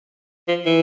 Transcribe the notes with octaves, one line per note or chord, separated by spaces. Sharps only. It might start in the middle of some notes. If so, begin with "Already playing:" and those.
F3
E3